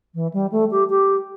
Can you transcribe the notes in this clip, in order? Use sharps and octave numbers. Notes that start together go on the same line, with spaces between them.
E3
G3
A3
G4
G4